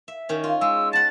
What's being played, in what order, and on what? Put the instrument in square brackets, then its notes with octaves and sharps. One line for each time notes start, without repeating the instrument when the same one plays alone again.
[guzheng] E5
D#3 C#4
F4
[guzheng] G#3 [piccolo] E6
[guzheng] F#5 A5 [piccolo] A6